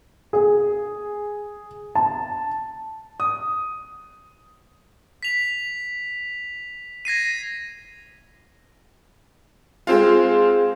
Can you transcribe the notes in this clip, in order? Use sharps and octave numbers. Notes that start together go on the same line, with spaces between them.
G#4
A5
D#6
B6 F7
G#6 A#6 C7 D#7
G#3 C4 F4